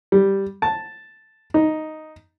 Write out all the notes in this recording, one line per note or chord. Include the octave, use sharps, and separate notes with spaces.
G3
A5
D#4